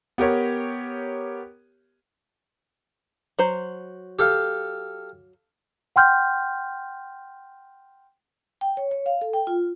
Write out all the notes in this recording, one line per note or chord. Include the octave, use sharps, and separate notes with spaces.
B3 G4 A#4 C#5
F#3 C5
G4 A4 F5
F#5 G5 C6 F6 G6
G5
C#5
C#5
F5
A4
G5
F4